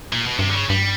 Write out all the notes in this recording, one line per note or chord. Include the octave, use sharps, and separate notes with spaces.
A#2
B2
G2 C3
D3
C#3
G2 G3